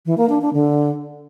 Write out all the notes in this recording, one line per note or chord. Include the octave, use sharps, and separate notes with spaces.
E3
A#3
D4
D4
D3